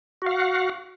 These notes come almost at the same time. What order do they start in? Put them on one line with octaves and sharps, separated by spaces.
F#4 F5 F#5